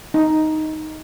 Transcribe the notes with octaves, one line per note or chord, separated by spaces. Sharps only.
D#4